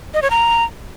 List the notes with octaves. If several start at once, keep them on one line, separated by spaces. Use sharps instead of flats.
D#5
C#5
A#5